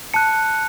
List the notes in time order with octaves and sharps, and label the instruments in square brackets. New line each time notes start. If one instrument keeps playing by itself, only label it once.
[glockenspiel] A5 F#6 C#7